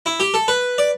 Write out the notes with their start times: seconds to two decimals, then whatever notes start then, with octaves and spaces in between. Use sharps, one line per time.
0.06 E4
0.20 G4
0.34 A4
0.48 B4
0.78 D5